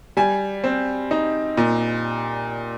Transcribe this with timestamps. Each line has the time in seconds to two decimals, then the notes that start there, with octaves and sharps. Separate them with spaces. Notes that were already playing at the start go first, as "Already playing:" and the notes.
0.17 G3 G#5
0.64 C4
1.11 D#4
1.57 A#2